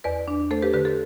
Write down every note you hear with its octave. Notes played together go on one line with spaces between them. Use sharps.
E2 B4 D5
D4
A3 A4 C5
G4 B4
D3 G4 B4
A4